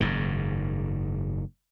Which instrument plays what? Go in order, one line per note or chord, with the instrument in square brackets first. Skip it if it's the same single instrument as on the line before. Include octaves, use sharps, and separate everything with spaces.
[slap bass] F#1 G#2 D#3